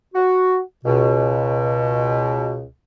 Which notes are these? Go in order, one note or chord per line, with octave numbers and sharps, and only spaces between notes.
F#4
C#2 B2